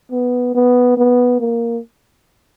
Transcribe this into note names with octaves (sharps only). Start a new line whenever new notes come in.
B3
B3
B3
A#3